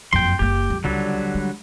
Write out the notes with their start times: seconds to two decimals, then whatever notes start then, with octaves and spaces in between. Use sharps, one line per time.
0.13 F#1 F2 G5 C6
0.39 F#1 A#3 G4
0.70 F2
0.84 C#2 D3 F#3 G3
1.34 G#3